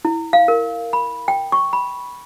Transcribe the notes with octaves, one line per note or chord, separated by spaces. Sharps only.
E4
F5
A#4
B5
G5
C#6
B5